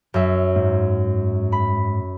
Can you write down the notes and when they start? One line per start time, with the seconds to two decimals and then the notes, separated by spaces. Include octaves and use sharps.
0.14 F#2 E5
0.56 G#2
1.52 B5